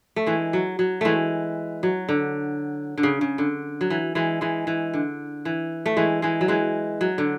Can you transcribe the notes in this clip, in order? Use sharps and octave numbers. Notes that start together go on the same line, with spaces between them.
A3
E3 G#3
F#3
F#3
E3 G#3 A3
F#3
D3
D3
C#3
C#3
D3
F#3
E3
E3 G#3
E3 G#3
E3
D3
E3
A3
E3 G#3
E3 G#3
F#3
E3 G#3
F#3
D3